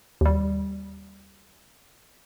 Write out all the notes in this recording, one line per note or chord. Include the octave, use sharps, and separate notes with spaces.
D#2 G3